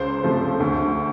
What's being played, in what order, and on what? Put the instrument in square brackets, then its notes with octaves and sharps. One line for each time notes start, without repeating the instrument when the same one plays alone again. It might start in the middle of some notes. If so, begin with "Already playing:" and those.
Already playing: [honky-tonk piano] C#2 C5
C3 F3 A3
D2